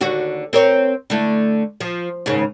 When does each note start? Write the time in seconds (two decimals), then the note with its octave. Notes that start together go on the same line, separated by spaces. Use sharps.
0.01 D#2 D3 F#4
0.53 C4 A#4 C#5
1.10 D3 A3 E4
1.81 F3
2.26 D#2 G#2 C#3